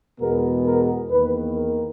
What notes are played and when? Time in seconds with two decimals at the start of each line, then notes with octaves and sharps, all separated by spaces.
0.20 E2 B2 G#3 B3 A#4
0.65 A#4
1.10 E2 D#3 A#3 B4
1.56 A#4